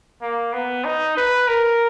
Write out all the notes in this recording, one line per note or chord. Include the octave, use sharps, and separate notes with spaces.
A#3
B3
D#4
B4
A#4